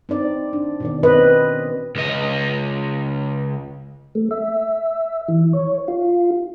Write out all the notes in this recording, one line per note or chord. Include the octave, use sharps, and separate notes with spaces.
C4 D#4 D5
D4
B2 D#3 D5
C4 C#4 B4 D#5
C#2 D#5
A3
E5
E3
C#5
F4